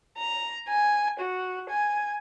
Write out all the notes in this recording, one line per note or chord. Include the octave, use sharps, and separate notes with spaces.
A#5
G#5
F#4
G#5